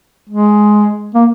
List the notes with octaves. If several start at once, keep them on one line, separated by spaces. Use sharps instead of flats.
G#3
A#3